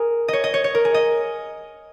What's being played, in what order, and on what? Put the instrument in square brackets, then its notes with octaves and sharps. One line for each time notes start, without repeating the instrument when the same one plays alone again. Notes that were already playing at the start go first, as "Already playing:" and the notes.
Already playing: [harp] G#4 A#4
C#5 D#5
D#5
C#5
C#5
A#4
G#4
D#5